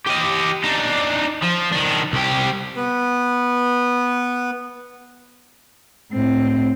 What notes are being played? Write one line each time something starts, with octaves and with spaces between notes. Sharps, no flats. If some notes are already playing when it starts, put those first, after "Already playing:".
G4 D#5
D4 D#4
F3
D#3 D4
C2 G4
B3 B4
A2 C4